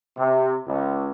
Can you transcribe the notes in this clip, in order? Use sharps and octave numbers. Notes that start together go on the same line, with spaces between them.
C3
C#2